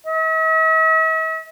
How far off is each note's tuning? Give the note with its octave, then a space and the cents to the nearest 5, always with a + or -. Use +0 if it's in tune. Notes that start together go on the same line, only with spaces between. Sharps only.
E5 -45